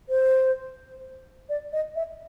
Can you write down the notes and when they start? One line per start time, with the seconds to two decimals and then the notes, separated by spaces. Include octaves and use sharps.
0.09 C5
1.49 D5
1.73 D#5
1.96 E5